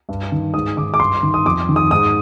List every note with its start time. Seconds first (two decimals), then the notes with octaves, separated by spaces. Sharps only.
0.09 G2
0.32 D#3
0.54 G#2 D#6
0.77 D#3 D6
0.94 D6
0.99 G2 C6
1.23 D#3
1.34 D#6
1.45 F2 D6
1.69 D#3
1.76 D#6
1.90 G#2 D#6